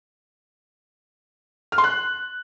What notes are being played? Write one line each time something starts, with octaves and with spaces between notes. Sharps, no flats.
F6
C6
F#6